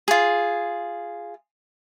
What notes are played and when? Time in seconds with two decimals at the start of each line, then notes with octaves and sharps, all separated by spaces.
0.08 F4 G#4